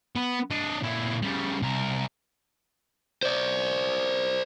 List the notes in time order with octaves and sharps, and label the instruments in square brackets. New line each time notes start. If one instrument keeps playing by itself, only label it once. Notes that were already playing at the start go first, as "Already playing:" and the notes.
[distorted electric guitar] B3
D4 D#5
A#2 E4
C#3 G3
C2 A#4
[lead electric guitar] C5 D5